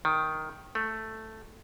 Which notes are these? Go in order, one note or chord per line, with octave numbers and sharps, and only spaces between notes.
D#3
A3